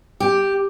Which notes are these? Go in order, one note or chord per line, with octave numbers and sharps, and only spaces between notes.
G4